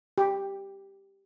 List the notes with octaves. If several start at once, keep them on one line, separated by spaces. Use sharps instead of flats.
G4